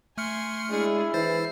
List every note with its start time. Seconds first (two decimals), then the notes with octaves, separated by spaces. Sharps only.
0.18 A3 G#5 C6 F6 C#7
0.70 G#3 D4 E4 G#4
1.14 E3 C5 A6 C7